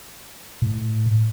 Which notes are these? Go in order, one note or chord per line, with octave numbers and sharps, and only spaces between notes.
A2